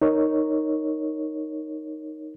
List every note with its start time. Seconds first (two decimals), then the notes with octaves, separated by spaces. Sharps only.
0.02 D#4 A#4 C#5